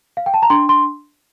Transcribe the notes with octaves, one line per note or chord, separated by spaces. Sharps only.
F5
G5
A5
A#5
D4 C6
C6